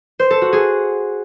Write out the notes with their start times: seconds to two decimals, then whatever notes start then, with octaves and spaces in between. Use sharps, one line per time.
0.19 C5
0.30 A4
0.42 F#4
0.53 G#4